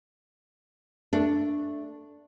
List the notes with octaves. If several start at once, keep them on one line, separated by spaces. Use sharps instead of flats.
A3 D4